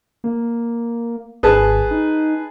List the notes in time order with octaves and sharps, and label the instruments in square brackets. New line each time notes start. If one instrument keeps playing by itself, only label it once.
[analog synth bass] A#3
[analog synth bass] G#1 [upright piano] G#4 B4 A5
[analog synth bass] D#4